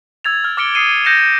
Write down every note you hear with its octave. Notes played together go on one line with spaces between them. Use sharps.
E6 G#6 A6 F7
F6
D6 F6 A6 C#7 D7 G7
D#6 E6 C7 C#7 D#7 G7
F6 G6 A#6 C#7 E7 F7
D#7